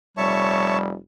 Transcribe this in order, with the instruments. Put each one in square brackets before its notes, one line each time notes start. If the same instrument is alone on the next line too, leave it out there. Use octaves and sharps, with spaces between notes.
[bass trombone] F1 [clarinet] G3 [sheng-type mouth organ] C#5 A5 [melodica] E5 C#6